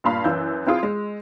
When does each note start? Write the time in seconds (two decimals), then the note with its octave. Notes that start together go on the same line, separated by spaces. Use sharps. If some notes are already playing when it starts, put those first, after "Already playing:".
0.04 G2 A#2 F5 B5
0.24 F#2 E3 E6 G6
0.67 C4 E4 F4 G#4
0.83 G#3